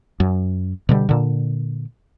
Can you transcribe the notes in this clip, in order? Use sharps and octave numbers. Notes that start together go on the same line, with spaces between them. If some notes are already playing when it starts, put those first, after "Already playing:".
F#2
B2 D3 G3
A#2 D3